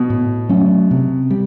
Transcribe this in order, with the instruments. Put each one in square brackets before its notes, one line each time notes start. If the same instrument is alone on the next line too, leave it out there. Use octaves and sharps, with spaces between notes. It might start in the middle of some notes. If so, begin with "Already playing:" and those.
Already playing: [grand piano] B2
[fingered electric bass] A2
F#3 A3 C#4
C3
G3